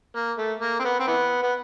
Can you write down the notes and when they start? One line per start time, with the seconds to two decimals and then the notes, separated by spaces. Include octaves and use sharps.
0.16 A#3
0.38 A3
0.61 A#3
0.79 C4
0.85 B3
1.00 C4
1.07 E3 B3
1.43 B3